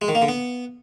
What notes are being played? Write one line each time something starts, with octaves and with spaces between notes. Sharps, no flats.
G#3
D#3
A#3
D3
B3